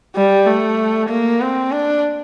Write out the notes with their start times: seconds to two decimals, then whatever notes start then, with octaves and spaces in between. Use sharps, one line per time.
0.16 G3
0.47 A3
1.09 A#3
1.41 C4
1.72 D4